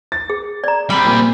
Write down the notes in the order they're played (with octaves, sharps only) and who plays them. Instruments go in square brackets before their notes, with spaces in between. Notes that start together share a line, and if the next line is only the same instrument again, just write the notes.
[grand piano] A6
[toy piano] G#4
D5 A#5
[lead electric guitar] G3 C4 [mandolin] B5
[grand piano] A#2